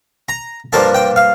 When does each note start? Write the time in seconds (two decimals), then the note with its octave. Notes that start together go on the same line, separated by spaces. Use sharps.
0.29 A#5
0.73 G2 F3 A#3 A5
0.95 G5
1.16 F5